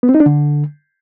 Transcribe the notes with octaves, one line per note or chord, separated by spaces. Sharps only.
B3
C4
D#4
D4
D3